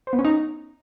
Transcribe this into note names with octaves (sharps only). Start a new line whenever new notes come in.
C5
B3
C#4
D#4